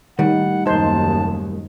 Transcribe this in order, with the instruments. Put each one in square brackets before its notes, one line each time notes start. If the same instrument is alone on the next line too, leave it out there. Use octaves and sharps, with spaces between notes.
[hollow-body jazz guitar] A2 G3 [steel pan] D#3 [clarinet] F#5
[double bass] F#1 D#2 [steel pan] D#4 C5 [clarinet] A5